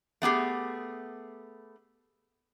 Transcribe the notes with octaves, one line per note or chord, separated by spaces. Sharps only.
A3 B3 G4 G#4